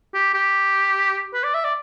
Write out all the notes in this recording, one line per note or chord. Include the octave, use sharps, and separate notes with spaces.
G4
G4
B4
D5
E5
D5